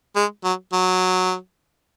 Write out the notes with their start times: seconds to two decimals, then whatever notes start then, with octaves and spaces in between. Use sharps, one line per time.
0.16 G#3
0.44 F#3
0.73 F#3